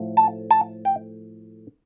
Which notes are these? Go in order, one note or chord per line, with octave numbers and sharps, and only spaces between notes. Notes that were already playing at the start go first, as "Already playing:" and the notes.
Already playing: A2 F3 A3
A5
A5
G5